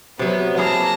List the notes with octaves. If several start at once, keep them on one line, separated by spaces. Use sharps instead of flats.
C3 F#3 B3
A#3 E4 G#4 A5 A#5